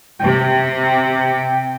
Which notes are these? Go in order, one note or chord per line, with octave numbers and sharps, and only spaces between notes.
C3 G5